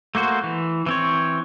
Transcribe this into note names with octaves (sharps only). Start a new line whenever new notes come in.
A3 A#3 F#4 C5
E3
E3 C4 C#5